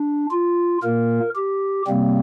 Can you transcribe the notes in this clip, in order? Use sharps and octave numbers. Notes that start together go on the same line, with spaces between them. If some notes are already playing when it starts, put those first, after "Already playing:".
Already playing: D4
F4
A#2 A#3 A#4
G4
C3 G3 A#3 C4